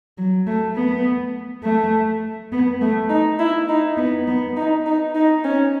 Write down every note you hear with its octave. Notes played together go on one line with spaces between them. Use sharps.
F#3
A3
B3
A3
B3
A3
D#4
E4
D#4
B3
B3
D#4
D#4
D#4
C#4